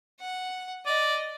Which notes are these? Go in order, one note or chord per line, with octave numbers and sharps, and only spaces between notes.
F#5
D5 D#5